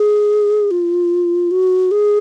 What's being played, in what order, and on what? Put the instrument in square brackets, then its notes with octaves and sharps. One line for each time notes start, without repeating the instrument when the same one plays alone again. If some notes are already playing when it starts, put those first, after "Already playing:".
Already playing: [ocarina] G#4
F4
F#4
G#4